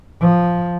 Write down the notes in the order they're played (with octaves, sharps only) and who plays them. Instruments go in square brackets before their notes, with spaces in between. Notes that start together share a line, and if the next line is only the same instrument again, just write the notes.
[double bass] F3